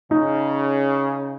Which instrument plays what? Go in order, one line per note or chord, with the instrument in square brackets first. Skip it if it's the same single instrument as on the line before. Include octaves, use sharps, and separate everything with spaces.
[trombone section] C#3 [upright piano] D#4